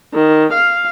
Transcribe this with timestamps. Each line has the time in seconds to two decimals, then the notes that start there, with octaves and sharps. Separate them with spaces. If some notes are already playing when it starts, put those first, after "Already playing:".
0.14 D#3
0.53 F5